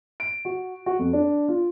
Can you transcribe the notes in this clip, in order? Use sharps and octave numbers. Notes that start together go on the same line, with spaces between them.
D7
F#4
F#4
F2
D4
F4